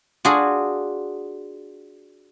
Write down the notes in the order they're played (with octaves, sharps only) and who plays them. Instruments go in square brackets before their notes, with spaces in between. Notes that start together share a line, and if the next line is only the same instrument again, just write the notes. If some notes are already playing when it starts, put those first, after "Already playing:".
[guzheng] D4 F4 F#4 G#4